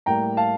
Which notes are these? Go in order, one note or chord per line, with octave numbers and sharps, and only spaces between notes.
A2 G3 A#3 G5 A#5
F5 A5